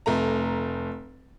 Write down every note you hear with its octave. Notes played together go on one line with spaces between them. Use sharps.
F1 A3 A#5